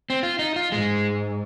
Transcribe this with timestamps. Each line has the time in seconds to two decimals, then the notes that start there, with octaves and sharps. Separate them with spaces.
0.10 C4
0.23 F4
0.39 D#4
0.56 F4
0.71 G#2 G#3